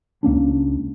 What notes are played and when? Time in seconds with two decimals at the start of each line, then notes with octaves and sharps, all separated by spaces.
0.23 C#2 A#3 C#4 D4